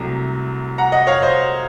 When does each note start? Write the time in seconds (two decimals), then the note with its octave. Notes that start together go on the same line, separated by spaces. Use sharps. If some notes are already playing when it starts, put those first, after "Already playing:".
Already playing: C2 C3 F#3 A3 A#5
0.78 F#5 A#5
0.92 D#5 F#5
1.07 C#5 F5
1.22 C5 D#5